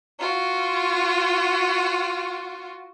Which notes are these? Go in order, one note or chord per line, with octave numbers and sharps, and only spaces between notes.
F4 F#4